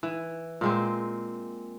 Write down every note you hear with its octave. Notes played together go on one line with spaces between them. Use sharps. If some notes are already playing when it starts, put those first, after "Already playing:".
E3
A#2 G#3 C4